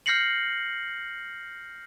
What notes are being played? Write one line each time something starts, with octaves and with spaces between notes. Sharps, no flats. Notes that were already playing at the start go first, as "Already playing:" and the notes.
F6 G6 A#6 C7 C#7 F#7